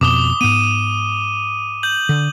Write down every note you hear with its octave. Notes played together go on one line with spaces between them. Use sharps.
F2 B2 D6 D#6 G7
G#2 B3 D#7
G6 F#7
D3